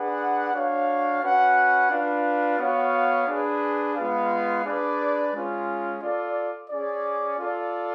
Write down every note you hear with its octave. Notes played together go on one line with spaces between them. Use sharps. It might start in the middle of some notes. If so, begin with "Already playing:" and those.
Already playing: D4 G#4 B4 F#5
D4 F#4 C#5 F5
C#4 F#4 B4 F#5
D4 F4 B4 F5
B3 F#4 C#5 F5
D4 G#4 B4
G#3 B3 F4 B4 F5
D4 G#4 B4 D5
G#3 C#4 F4
F4 A4 D5
C#4 G#4 D5
F4 A4 D5